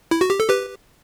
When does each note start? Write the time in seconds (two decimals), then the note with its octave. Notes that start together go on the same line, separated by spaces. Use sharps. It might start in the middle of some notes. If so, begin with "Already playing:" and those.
0.11 E4
0.21 F#4
0.30 G4
0.40 A4
0.49 G4 B4